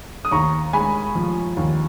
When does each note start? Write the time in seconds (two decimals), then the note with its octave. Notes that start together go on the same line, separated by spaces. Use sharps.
0.25 D#6
0.31 D#2 A#5 C#6
0.73 G#3 G#5 B5
1.15 F3
1.57 D#2